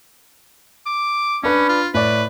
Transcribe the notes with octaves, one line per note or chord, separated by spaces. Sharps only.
D6
C#4 D4 B4 B5
F4
A2 B4 D5